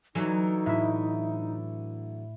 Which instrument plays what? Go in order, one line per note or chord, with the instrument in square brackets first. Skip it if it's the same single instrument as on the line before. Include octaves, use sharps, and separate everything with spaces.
[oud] D3 E3 F#3 [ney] D#4
[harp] A2 E4